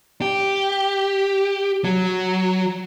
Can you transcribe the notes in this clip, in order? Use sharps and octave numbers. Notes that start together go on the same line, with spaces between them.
G4
F#3